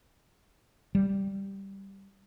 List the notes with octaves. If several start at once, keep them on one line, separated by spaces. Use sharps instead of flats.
G3